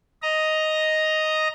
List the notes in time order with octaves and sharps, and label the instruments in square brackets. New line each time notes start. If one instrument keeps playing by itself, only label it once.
[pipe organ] D#5 A#5